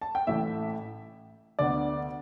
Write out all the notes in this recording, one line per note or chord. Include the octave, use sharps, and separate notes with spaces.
A5
G5
A1 A2 E3 E5
D2 D3 B3 D5